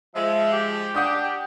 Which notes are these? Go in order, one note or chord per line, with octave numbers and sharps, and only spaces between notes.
F3 G#3 E5
G4
D4 F#5 D#6 G6